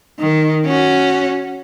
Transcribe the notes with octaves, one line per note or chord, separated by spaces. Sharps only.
D#3
C#4 F#4